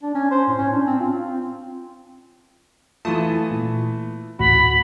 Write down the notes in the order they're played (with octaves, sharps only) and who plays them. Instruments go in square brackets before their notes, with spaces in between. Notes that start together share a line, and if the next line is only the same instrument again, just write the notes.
[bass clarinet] D4
C#4
C5
A2
C#4
D4
C4
F4
C4
[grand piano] E3 A3 [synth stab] F4 A5 D#6
[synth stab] A#2
[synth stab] A1 D2 A2 [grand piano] F#4 [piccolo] B5